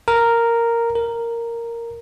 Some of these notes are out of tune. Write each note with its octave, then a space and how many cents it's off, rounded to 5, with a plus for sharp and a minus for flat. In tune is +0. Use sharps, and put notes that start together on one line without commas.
A#4 -5
A#4 -5